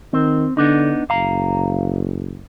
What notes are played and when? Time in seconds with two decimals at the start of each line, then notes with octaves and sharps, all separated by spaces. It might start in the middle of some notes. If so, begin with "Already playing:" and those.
0.13 D#3 C4
0.57 D3 B3 D4 D#4
1.10 F#1 F5 A#5